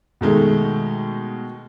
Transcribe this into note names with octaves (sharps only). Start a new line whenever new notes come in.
B2 D#3 G#3 A3